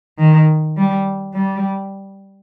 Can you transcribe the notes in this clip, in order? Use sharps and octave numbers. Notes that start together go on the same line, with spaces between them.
D#3
G3
G3